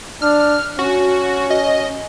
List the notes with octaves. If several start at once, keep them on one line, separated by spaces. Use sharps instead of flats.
D4 F6
C#4 F#4
D#5